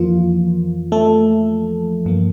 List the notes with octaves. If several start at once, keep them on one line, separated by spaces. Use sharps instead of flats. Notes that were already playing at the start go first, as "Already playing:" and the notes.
Already playing: F2 E3 F3 A#3 F4
A3 A4
G2 F3 A#3